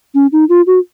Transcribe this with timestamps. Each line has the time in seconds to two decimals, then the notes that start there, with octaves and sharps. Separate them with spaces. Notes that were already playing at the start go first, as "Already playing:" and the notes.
0.15 C#4
0.32 D#4
0.49 F4
0.67 F#4